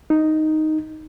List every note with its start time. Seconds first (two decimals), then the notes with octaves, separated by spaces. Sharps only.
0.10 D#4